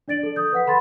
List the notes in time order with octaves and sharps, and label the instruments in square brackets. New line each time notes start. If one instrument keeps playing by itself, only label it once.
[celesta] D4 D5 A6 D7 F#7
A4
D#6 G6
B4 F#5 B6
A4 F#5 B5 C6 A6